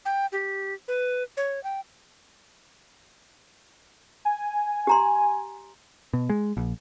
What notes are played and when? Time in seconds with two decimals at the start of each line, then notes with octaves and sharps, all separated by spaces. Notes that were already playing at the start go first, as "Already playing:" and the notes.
0.05 G5
0.32 G4
0.88 B4
1.37 C#5
1.64 G5
4.25 G#5
4.87 G4 A#5 C6
6.13 B2
6.30 G#3
6.57 A#1